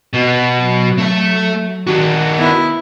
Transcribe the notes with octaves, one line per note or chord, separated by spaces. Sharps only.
B2
F#3
A3 E5
D#3 F#4
B3 E4